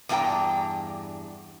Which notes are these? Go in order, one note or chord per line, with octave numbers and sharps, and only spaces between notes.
E2 G2 D4 F4 G5 A#5